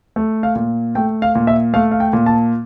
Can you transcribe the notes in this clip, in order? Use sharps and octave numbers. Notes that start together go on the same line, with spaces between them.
A3
F5
A#2
A3 G5
F5
A#2
E5
A3 F5
F5
G5
A#2
A5